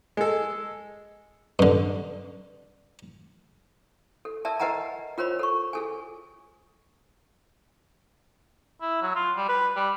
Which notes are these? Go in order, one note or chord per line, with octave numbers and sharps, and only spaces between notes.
G#3 A4
G2 D3
A4
A#4 D5 E5 A5
A#4 B4 D#5 F#5 G#5 A#5
F4 A#4 C5 C#5 B5
A4 C#6
G#4 A4 G#5
E4
F#3
F4
G3
B4
G3